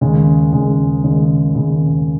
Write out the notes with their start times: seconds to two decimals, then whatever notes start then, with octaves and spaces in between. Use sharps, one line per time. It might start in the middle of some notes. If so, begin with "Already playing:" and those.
0.01 D#2 C#3 G#3
0.53 D#2 C#3 G#3
1.03 D#2 C#3 G#3
1.55 D#2 C#3 G#3